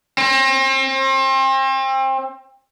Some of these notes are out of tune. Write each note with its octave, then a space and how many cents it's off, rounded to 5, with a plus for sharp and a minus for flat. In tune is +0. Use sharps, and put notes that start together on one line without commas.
C4 +35